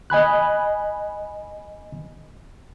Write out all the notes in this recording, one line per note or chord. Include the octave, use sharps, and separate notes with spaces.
D#5 G#5 B5 F#6